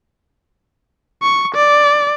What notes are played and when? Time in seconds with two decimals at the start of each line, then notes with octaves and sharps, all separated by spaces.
1.22 C#6
1.55 D5